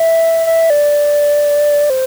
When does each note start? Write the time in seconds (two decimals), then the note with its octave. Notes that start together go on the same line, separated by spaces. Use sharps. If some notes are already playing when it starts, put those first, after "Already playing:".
Already playing: E5
0.47 E5
0.70 D5
1.90 C5